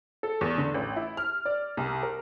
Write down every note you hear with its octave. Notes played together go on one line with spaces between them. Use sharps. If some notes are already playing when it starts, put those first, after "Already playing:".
A4
E2
D3
A1
E4
F6
D5
C2
A#4